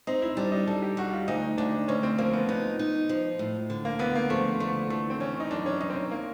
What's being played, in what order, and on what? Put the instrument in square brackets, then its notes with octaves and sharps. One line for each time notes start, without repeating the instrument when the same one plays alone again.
[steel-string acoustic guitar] C4 [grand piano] D#4
[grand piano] E4
[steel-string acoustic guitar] G3 [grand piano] D4
[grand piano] D#4
[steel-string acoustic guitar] G3 [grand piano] A4
[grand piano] G4
[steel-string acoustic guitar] G3 [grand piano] F#4
[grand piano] F4
[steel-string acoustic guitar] D2 [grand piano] D#4
[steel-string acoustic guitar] D2 [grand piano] D4
[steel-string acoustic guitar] D2 [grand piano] C#4
[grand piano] C4
[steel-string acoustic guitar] F3 [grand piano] A#3
[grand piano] B3
[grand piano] B3 [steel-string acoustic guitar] D#4
[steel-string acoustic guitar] D#4
F3
A2
D3
[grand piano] A#3
[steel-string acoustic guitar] D3 [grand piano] B3
[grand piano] A#3
[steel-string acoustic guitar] F3 [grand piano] A3
[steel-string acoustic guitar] D3 [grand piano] A3
[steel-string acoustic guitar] E3 [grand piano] A3
[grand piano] C4
[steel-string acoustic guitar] E3 [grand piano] C#4
[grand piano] D#4
[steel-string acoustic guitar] F#2 [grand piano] D4
[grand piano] C#4
[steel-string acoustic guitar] F#2 [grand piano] D#4
[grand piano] C4
C#4
A#3